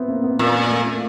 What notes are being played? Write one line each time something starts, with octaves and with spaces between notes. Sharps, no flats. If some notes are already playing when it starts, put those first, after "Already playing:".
Already playing: B3 C4 E4
A#3
B3
A#2 A#3
A#3
A3
A#3